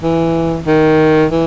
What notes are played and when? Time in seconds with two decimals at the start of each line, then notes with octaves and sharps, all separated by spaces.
0.03 E3
0.67 D#3
1.31 E3